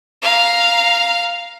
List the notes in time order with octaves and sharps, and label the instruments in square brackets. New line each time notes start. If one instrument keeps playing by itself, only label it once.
[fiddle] F5 A#5